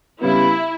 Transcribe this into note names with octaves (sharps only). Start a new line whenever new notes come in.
C#3 G3 B3 E4